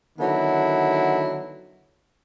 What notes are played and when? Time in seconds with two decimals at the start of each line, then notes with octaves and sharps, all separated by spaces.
0.18 D3 D#3 F#3 B3 E4